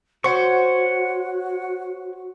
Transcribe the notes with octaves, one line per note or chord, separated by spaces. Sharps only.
F#4 C5 C#5 F#5 C#6